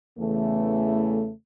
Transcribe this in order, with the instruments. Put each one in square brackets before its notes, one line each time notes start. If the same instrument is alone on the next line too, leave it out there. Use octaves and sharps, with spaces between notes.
[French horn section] E2 C#3 E3 A3